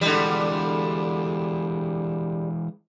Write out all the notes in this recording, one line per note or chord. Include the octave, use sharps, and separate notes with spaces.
D3 E3 G3 G#3